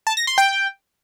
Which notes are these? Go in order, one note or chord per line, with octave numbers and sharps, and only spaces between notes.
A5
A#6
C6
G5